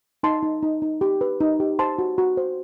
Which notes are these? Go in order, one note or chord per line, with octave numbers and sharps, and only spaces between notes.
D#4 A5 C6
D#4
D#4
D#4
G4
B4
D#4
G4
C5 A5 C6
F#4
F#4
C5